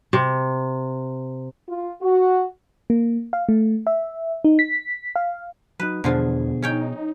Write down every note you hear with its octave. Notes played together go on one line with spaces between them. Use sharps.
C3
F4
F#4
A#3
F5
A3
E5
D#4
B6
F5
F#3 D#4 B4
E2 B2 D3 F3 F4 G#4
C#4 D#4 C#5 G5